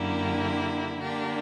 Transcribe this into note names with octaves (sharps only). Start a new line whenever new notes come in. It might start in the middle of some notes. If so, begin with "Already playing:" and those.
Already playing: F#2 D3 A#3 E4 G4
D3 A#3 D4 G4